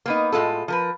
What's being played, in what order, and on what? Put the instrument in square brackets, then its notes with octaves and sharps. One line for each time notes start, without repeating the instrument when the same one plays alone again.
[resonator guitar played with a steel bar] A#3 B3 D#4
A2 G#3 F4 A4
F3 A#4 B4